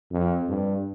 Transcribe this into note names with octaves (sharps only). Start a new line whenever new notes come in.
F2
G2